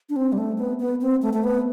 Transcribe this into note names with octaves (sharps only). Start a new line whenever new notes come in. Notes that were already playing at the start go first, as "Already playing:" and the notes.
D4
C4
G3
A3
B3
B3
C4
A3
A3
B3